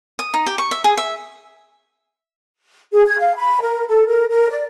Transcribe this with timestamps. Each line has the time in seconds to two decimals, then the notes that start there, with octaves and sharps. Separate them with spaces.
0.19 D#6
0.34 D#4
0.46 G4
0.58 C#6
0.71 E5
0.84 G#4
0.97 E5
2.93 G#4
3.06 G#6
3.19 F5
3.37 B5
3.61 A#4
3.87 A4
4.08 A#4
4.29 A#4
4.50 D5